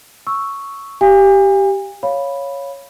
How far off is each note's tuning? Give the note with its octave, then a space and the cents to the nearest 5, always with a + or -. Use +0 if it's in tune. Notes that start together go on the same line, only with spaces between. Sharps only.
C#6 +0 E6 +0
G4 -10 F5 +0 G#5 -40
C#5 +0 F5 +0 B5 +0